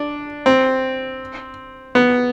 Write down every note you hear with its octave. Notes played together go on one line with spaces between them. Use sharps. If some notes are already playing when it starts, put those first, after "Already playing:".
Already playing: D4
C4
B3